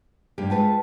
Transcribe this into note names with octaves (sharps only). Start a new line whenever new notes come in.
G2 A#3 G4
G#3 F4 B4 G5 A5